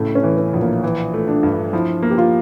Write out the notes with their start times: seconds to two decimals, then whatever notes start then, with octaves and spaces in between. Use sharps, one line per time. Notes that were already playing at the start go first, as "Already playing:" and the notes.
Already playing: A2 C#3 A3
0.15 C#4
0.23 E3
0.38 C#4
0.53 A#1
0.61 A#3
0.83 E3
1.14 A3
1.28 D4
1.43 G2
1.73 F3 E4
2.03 A#3
2.11 G4
2.18 F4